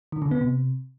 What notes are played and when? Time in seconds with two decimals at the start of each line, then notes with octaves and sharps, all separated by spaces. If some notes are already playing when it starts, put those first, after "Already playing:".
0.12 D#3
0.22 D3
0.31 B3
0.41 C3